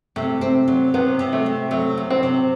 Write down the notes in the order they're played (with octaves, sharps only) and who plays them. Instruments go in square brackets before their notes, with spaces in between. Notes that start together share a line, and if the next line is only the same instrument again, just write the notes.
[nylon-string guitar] C3 [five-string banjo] A3
[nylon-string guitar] C4
F#3
[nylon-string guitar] C3 [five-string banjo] B3
[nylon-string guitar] C3
[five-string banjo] A3
[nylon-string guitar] C4
[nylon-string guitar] F#3 [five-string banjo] A3
[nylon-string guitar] C3
[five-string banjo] C4
[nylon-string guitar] C3